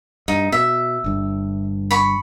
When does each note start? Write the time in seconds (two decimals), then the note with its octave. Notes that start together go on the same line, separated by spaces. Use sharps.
0.28 G2 D#4
0.52 B2 E5
1.04 G1 G2
1.91 B5 C#6